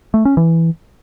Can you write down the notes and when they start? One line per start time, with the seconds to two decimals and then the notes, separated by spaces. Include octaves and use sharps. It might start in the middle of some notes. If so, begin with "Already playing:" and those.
0.14 A3
0.25 C#4
0.37 E3